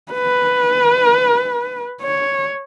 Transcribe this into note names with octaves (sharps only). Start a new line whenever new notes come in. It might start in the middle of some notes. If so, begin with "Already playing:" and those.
B4
C#5